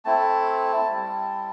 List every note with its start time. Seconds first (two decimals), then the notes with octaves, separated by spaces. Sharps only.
0.05 A3 C4 E4 A5
0.89 G3 C4 E4